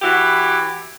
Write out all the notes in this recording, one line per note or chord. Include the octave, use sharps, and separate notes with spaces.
E3 E4 F#4 G4